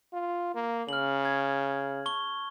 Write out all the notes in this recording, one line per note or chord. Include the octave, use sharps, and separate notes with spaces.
F4
A#3
C#3 F6 F#7
G#6
A5 C#6 G7